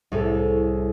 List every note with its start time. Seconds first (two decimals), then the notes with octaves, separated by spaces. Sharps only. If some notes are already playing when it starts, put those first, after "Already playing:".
0.12 C2 A2 G#4 A4